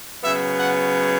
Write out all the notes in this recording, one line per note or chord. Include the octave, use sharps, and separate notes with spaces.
C#3 F#3 B3 E5
F#5